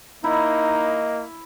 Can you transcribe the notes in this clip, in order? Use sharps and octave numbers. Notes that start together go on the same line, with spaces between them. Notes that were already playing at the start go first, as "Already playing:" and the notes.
A#3 D#4 E4 D#5